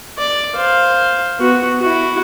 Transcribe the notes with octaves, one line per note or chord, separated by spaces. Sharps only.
D5
C5 F5
B3 F#4
E4 F#4